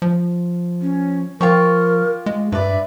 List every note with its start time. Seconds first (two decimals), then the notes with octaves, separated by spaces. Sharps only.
0.02 F3
0.81 C#4
1.41 F3 F4 G4 A#4 C#6
2.26 G#3
2.52 G2 B4 D5 E5